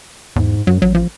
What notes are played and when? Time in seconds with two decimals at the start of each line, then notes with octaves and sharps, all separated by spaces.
0.36 E2 G#2
0.67 F#2 F#3
0.82 A1 F#3
0.95 F3